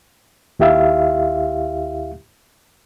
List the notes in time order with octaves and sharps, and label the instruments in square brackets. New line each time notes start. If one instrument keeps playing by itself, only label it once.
[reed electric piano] D#2 E4 G4 E5 F5